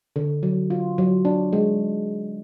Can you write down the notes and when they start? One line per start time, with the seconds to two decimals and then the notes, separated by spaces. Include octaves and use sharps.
0.16 D3
0.43 F#3
0.70 F4
0.98 F#3
1.25 D4
1.53 G#3